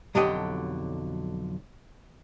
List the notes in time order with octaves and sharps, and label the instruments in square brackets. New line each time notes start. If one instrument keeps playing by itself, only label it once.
[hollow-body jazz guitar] B1 F2 D3 F#3 G4 D#5